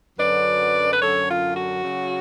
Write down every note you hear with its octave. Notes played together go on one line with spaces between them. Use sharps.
F#2 D3 F#3 C#4 B4 D5
B4
F#2 D3 F#3 C#4 A4 C#5
F4
F#4
C#3 F#3 C#4